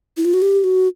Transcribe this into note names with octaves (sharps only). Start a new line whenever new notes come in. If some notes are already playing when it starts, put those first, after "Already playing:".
E4
F4
F#4
G4
F#4